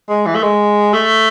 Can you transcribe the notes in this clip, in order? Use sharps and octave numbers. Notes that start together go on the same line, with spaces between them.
G#3
E3
A3
G#3
A3